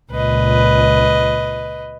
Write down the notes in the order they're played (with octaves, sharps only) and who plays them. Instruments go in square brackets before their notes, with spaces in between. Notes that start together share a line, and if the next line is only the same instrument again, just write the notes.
[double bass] C#2 A#2 [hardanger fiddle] B4 D#5